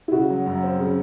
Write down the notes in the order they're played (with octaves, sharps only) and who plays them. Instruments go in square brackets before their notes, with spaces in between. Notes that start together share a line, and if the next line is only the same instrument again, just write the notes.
[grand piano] E4
[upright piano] C#3 [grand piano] F#4
[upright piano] F#3
F#2
C4
C#3